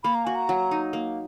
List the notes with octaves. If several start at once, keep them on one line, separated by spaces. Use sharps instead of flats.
A#3 B5
A#5
F#4 G#5
A#5
F#3
D#4
A#3